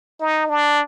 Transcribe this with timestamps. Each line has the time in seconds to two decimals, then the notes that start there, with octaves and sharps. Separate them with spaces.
0.21 D#4
0.49 D4